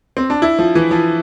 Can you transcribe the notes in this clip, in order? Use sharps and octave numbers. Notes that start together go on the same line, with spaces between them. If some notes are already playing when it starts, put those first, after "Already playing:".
C4
D4
E4
F3
E3
F3